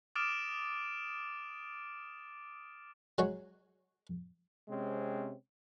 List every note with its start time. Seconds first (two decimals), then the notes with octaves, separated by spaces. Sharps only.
0.16 D6 D#6 F6 A6 D7 E7
3.18 F#3 G#3 F#4 C#5
4.69 C3 G#3 C4 C#4